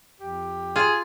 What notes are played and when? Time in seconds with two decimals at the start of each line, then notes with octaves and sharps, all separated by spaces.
0.21 F2 G4
0.76 F4 G#4